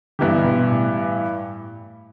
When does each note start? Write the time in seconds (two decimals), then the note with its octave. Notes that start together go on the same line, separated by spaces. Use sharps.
0.19 G2 D3 E3 B3 E4 G4
0.45 B2
0.59 B2
0.72 A2